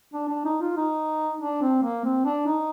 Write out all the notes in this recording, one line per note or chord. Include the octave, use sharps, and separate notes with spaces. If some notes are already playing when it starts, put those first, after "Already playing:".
D4
D4
D#4
F4
D#4
D4
C4
A#3
C4
D4
D#4